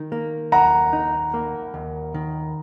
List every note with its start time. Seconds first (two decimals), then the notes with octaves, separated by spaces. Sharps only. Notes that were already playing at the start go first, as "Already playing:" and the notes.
Already playing: D#3
0.12 A#3
0.52 D#2 F#5 A#5
0.93 D#4
1.34 A#3
1.74 D#2
2.14 D#3